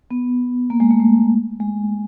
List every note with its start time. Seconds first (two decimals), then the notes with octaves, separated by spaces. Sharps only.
0.11 B3
0.70 A#3
0.80 G#3
0.91 A3
1.00 G#3
1.60 G#3